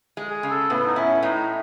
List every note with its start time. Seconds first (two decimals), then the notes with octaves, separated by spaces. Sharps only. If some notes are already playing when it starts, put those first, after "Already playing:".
0.17 G#3
0.30 G#4
0.43 C#3
0.50 A4
0.70 A2 B3
0.87 D#4
0.96 C#4 E4
1.23 A2 D#4